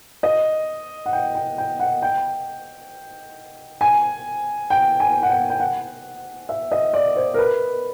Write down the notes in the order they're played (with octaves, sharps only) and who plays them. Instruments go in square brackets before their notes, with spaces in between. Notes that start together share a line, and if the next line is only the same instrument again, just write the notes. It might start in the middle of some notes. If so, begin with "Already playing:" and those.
[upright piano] D#5
F#5
G5
G5
G5
F#5
G5
G#5
G5
G#5
F#5
G5
G5
F#5
E5
D#5
D5
C5
A#4
B4